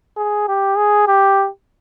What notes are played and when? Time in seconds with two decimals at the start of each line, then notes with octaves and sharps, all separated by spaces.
0.17 G#4
0.48 G4
0.77 G#4
1.08 G4